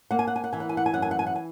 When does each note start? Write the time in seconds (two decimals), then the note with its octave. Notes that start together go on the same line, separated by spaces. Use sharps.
0.11 A#3 F#5
0.19 G#5
0.27 F#5
0.36 G#5
0.44 F#5
0.53 E3 G#5
0.60 F#5
0.69 G#5
0.77 F#5
0.86 G#5
0.94 F#2 F#5
1.02 G#5
1.11 F#5
1.19 G#5
1.26 F#5
1.35 G#5